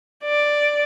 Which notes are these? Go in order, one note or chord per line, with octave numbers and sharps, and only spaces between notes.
D5